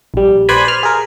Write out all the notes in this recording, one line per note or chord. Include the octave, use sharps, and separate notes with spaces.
A#1 G3
B4 C5 D5 G#5 B5
C5 F6
G#4 A#4